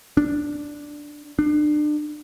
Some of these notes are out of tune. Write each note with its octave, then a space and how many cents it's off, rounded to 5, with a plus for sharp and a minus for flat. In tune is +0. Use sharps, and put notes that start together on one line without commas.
D4 +0
D4 +35